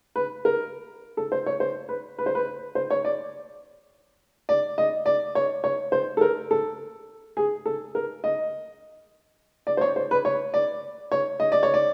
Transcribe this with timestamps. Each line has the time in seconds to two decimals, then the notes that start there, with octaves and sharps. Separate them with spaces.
0.16 B4
0.45 A#4
1.17 A4
1.32 C5
1.46 C#5
1.60 C5
1.89 B4
2.19 B4
2.26 C5
2.35 B4
2.75 C5
2.91 C#5
3.05 D5
4.49 D5
4.78 D#5
5.06 D5
5.35 C#5
5.64 C#5
5.92 C5
6.17 A4
6.21 A#4
6.51 A4
7.37 G#4
7.66 A4
7.95 A#4
8.24 D#5
9.67 D5
9.77 C5
9.81 C#5
9.96 C5
10.11 B4
10.25 C#5
10.54 D5
11.12 C#5
11.40 D#5
11.52 D5
11.63 C#5
11.74 D5